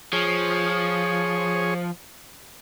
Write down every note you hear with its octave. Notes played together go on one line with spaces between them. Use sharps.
F3 G#4 C#5